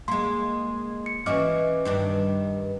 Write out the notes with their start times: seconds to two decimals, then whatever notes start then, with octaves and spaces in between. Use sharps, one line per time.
0.08 G#3 A#3 C6
1.06 C#7
1.26 E3 C#4 F#4 D#5 D6 F6
1.85 G2 D#3 D4